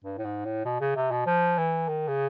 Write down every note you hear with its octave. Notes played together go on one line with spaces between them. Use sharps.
G2
A2
G#2
A2
B2
C#3
C3
B2
F3
E3
D#3
C#3